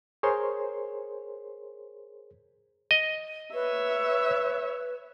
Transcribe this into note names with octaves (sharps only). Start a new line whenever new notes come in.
G#4 A#4 C5 C#5 C6
D#5
B4 C#5 E5